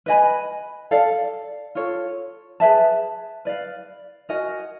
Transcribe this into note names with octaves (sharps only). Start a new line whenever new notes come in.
B4 D#5 G#5 B5
A4 D5 F5
F4 A4 C#5
G#4 B4 E5 A5
B4 D5 F5
F#4 A#4 D#5 G#5